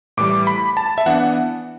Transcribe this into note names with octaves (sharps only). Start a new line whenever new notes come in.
A2 E3 G3 D6
B5
A5
E5
E3 B3 D4 F#5